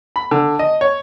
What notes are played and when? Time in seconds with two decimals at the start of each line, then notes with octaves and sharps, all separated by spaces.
0.16 B5
0.31 D3
0.59 D#5
0.81 C#5